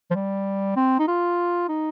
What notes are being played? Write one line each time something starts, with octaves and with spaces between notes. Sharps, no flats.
F3
G3
C4
D#4
F4
D#4